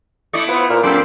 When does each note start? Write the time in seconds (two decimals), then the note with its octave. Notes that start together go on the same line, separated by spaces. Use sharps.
0.34 A3 E4 D5 D#5 C#6
0.49 B3 F4 B4 C5
0.70 A#2 A#4
0.83 F#2 C4 A4 B5 C6 D6